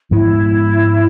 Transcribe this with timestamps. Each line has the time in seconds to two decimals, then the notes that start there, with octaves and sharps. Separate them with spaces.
0.11 G#2 F3 G#3 B3 E4